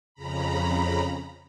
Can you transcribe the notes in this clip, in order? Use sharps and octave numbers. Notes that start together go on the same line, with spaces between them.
F2 C#3 A#5 B5